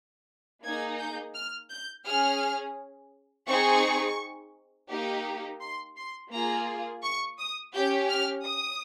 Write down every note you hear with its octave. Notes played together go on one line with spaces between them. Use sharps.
A#3 D#4 G#4 G#6
G6
F6
G6
C#4 G#4 F6
C4 D#4 G#4 C#6
A#3 D#4 G4
C6
C6
A#3 F4 G#4 A#5
C#6
D#6
C#4 G4 G6
F6
D#6